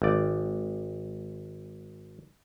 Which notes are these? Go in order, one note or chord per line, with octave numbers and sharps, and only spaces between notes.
G#1 D5